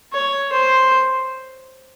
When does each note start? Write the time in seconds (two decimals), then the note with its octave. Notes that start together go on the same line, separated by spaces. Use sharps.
0.13 C#5
0.52 C5